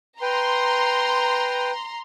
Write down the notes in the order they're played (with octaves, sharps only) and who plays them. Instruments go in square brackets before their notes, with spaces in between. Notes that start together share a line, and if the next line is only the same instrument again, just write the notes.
[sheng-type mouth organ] B4 G5 [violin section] A#5 C6